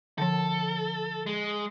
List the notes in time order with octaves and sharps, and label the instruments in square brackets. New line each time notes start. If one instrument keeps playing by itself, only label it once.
[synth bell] D3 F3 [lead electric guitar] A4
[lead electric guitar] G#3